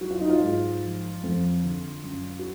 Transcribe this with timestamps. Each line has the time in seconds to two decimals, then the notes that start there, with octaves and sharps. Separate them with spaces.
0.01 F#3 F#4
0.11 F4
0.21 D#4
0.29 F4
0.41 G#2
0.83 F3
1.23 F2
1.63 D3
2.04 F#2
2.39 F#4